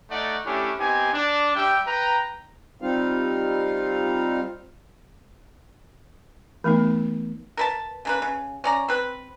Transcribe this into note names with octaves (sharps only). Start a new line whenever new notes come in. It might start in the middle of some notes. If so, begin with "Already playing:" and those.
A3 D#4 D5 F#5
A3 C#4 D4 E4 G4
B3 C4 D#4 G4 G#5
D4
G3 G4 E5 G5
B4 G5 A#5
G3 C4 D#4 F4 F5
E3 A3 B3 D#4
A#4 B4 A5
C#3 A#3 B4
C#3
C#4 D5 A#5
C4 B4